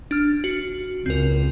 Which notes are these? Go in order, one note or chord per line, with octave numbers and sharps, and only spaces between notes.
D4 F6
F#4
C#2 C4 A#4